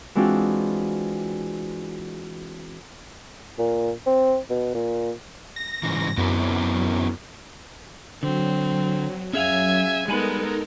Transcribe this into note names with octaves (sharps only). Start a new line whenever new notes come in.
E3 G#3 C4 D4 F4 F#4
A#2
C4
B2
A#2
A#6
G#2 C#3 E3
F#2 B3 C4 E4
D3 F#3 C4
F#2 F#3 C#4 G#4 E5 F5 G#5
G3 G#3 B3 D#4 A4 A#4 G#5 B5